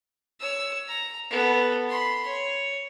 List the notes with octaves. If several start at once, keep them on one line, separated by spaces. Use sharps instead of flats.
C#5 E6
A#5
B3 A4
B5 C6
C#5